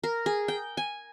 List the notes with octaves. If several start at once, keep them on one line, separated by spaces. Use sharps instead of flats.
A#4
G#4
G5
G#5